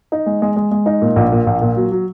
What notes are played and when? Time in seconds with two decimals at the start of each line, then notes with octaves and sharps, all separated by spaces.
0.12 D#4
0.26 G#3
0.42 G#3
0.56 G#3
0.71 G#3
0.86 D#4
1.02 A#2
1.16 A#1
1.32 A#2
1.47 A#1
1.62 A#2
1.77 F#3
1.92 F#3